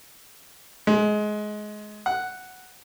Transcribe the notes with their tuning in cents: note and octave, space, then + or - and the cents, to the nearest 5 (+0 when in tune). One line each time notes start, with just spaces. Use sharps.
G#3 +20
F#5 +0